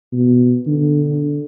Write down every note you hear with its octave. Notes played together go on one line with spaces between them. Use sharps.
B2
D3